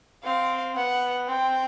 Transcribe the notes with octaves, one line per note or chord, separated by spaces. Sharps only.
C4 F5
B3 F#5
C4 G5